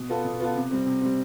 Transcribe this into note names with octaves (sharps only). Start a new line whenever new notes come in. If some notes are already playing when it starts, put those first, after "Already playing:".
Already playing: B2
B3 F4 A4
B2
B3 F4 A4
C3
G3 C4
C3
G3 C4